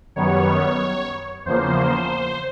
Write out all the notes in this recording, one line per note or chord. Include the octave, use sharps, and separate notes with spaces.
F#2 D#3 G3 B3 C#5
E2 C#3 F3 A#3 C5